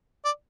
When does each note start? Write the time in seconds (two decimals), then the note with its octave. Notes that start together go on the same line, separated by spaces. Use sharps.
0.25 D5